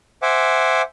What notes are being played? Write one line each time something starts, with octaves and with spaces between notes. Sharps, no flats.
C5 E5 F#5 G#5 D6